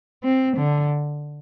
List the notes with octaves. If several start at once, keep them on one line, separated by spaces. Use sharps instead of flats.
C4
D3